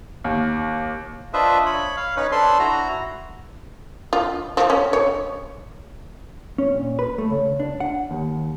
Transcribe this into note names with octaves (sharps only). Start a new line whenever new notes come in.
D#2
D4 F4 B4 C5 D#5 E5
C#5 B5
F5
C#4 D#4 B4 C#5
D4 A4 B4 C5 C6
E4 F#4 A#5
F4
F3
C#4
C#5
C#4
A#2
B4
A3
C#3
D4
F#5
D#2